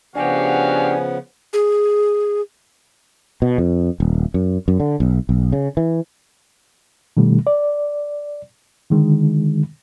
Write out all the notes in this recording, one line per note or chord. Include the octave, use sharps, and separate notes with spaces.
C#3 F3 B3 D4 F#4 G4 F5 G#5
G#4
B2
F2
D#1
F#2
F#2
D3
B1
B1
C#3
E3
B2 D#3 G3 A3
D5
D3 D#3 G#3